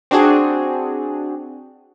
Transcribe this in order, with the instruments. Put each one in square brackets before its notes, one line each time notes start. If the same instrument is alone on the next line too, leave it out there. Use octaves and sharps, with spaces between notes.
[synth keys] C4 D4 F#4 G#4